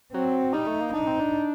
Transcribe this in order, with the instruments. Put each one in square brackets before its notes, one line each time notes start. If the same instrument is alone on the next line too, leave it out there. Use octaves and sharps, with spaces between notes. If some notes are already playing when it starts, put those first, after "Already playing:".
[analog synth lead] F#3 [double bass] C4
[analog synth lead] G3 [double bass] D#4
[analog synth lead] A3
A#3
[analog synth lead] D4 [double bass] D#4
[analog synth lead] C4
D4